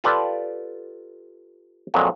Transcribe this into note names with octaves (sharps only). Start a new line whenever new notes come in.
F4 G4 A4 B4 D5
F2 A#2 F#3 G#3